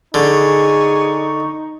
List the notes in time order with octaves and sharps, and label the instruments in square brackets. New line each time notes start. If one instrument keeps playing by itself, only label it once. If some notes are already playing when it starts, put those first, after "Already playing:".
[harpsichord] D3 [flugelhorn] D#4 [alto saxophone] G#4 [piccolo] C#6